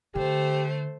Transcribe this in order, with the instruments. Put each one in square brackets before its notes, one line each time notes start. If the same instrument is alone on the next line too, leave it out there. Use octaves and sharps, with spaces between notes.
[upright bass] D3 [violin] A3 C5 [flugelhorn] G4